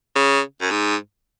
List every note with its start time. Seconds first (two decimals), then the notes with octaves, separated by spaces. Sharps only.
0.16 C#3
0.62 F#2
0.71 G#2